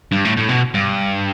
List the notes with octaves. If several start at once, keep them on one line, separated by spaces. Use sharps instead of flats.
G2
A2
A2
B2
G2